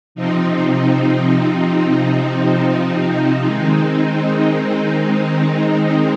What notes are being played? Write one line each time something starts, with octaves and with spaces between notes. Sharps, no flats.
C3 F3 C4 D#4
D#3 G#3 C4 D#4